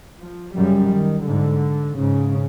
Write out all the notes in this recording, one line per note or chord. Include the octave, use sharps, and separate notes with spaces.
F3
F#2 C#3 G3
D#3
G#2 D3
G#2 C#3